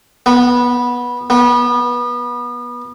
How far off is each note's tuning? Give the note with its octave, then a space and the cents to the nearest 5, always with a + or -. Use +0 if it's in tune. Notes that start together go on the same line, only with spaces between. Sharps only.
B3 -15
B3 -25